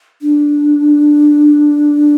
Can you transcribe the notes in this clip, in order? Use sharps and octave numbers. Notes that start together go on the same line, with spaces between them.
D4